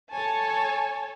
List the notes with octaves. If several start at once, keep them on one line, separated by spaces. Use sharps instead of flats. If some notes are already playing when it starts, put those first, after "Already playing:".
A4 C#5 G#5 A5